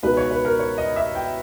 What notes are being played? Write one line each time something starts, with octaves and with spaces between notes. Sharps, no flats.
C#2 B2 G#3 D#4 B4
C#5
B4
A#4
C#5
D#5
E5
G5